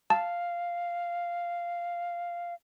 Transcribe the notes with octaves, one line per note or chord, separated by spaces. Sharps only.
F5 A5